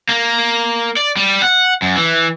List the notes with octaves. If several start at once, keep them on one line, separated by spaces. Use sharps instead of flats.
A#3
D5
G3
F#5
F#2
E3